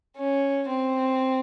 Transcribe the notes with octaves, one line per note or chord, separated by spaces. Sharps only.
C#4
C4